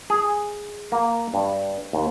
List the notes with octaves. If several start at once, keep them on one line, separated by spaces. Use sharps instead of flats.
G#4
A#3
G2
D#2